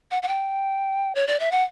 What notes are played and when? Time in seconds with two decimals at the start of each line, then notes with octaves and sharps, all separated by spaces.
0.11 F#5
0.22 F#5
0.28 G5
1.15 C#5
1.27 D5
1.40 E5
1.51 F#5